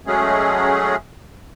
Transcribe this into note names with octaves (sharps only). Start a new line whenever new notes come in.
F#3 G#3 A3 C#4 G#4